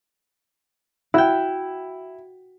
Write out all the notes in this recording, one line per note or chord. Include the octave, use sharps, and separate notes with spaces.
E4 F#4 G5